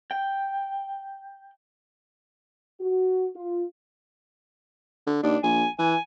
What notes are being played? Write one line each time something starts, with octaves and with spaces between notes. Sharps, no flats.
G5
F#4
F4
D3
D#2 D4
A#1 G#5
E3 G#5